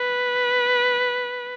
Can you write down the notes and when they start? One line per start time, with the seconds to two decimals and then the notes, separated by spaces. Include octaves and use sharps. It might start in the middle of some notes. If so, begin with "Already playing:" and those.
Already playing: B4